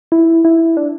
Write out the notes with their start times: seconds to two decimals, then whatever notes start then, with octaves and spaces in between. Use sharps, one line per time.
0.12 E4
0.45 E4
0.77 D4